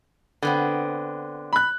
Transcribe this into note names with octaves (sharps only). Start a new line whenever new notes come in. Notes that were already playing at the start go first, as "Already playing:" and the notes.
D3 B3 C4
B5 F#6